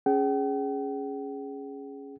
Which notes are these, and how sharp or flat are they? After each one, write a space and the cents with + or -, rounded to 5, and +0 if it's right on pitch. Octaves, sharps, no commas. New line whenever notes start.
C#4 +0 G#4 +0 G5 -45